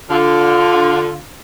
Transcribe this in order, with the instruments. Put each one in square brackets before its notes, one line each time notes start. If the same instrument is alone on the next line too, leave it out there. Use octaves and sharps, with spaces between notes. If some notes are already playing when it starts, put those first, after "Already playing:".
[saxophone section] D3 F4